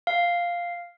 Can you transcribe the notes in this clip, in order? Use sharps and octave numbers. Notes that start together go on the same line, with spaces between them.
F5